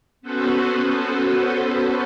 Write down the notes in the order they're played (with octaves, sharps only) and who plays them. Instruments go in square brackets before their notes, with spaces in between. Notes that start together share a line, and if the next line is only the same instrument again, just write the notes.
[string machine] B3 C#4 F#4 A4 B4 C5